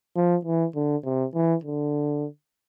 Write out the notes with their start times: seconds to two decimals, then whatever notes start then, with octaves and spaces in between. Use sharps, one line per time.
0.16 F3
0.45 E3
0.75 D3
1.04 C3
1.34 E3
1.64 D3